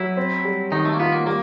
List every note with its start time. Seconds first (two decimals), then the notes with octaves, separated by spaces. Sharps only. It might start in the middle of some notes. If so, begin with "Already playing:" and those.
Already playing: F#3 E4
0.17 C4
0.45 G3
0.72 D#3 D#4
0.85 A3
0.93 A#3
1.00 B3 F4
1.12 A#3
1.26 G3 A#3